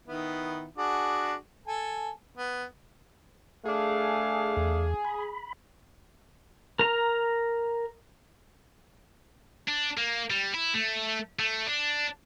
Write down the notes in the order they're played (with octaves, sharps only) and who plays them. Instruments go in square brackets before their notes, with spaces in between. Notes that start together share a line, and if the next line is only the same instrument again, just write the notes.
[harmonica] D#3 B3 E4
D4 F#4 G#4
A4 G#5
B3
[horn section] A3 D4 F5 [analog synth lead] G#4
[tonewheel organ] E2
B5
[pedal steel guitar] A#4 A#5
[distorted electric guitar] D4
A#3
G3
E4
A3
A3
D4